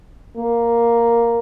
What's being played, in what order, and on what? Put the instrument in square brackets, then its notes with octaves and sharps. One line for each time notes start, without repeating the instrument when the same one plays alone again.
[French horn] A#3